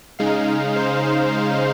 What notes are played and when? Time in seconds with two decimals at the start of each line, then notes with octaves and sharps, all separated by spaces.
0.19 C#3 G#3 D#4 F5
0.76 C5